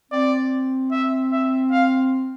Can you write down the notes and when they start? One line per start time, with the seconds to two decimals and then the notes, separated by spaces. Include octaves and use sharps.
0.11 C4 D5
0.92 E5
1.32 E5
1.71 F5